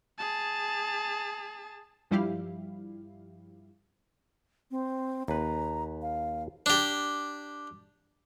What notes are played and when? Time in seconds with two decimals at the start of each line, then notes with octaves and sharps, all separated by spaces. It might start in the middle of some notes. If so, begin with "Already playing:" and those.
0.18 G#4 A5
2.11 G2 F3 G3 E4 G4 F5
4.71 C4
5.28 D#2 B4 A#5
6.02 F5
6.66 D4 G4